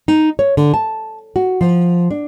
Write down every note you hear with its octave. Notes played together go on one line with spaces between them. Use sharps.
D#4
C#5
D3
A5
F#4
F3
D4